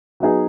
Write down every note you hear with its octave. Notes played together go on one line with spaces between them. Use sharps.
F#3 B3 D#4 G#4